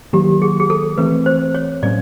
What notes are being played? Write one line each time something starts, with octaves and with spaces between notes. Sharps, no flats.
D#3 F#3 A#3 G4
G#4
G#4
A4
E3 A3 C4 B4
C5
C#5
A2 F#3 A#3 C#4 D5